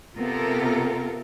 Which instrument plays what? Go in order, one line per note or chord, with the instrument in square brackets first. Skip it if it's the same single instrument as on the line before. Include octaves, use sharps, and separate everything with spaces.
[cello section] C3 B3 F4 A4 A#4